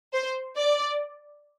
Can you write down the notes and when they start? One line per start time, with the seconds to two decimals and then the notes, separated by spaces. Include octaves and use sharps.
0.13 C5
0.57 D5